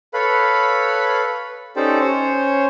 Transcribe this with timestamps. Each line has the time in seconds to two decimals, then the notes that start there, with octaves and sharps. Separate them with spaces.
0.14 A4 B4 C#5 F5 B5
1.76 C#4 D#4 G4 A4 C5 D5
2.00 C#4 C5 C#5